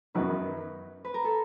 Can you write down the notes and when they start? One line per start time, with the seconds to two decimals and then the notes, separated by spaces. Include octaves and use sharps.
0.15 F#2 D#3 F#3 B3 D#4 B4
1.05 B4
1.14 A#4
1.25 A4